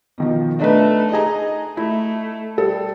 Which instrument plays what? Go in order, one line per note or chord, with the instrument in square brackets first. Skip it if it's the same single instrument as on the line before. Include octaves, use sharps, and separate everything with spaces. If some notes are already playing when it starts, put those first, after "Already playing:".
[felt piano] B2 D#3 F3
[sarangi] A3 [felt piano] D4 D#4 B4
[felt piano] D#4 G#4 A#5 [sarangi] D#5
[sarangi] A3 [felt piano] E4
[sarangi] G3 [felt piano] A4